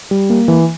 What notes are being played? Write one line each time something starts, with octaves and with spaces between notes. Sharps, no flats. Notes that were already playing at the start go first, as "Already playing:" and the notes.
G3
A#3
E3